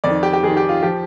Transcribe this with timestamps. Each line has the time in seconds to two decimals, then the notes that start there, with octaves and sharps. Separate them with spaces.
0.04 F2 D#3 D5
0.23 G4
0.33 G4
0.43 F2 D#3 G#4
0.57 G4
0.69 F4
0.83 F3 G4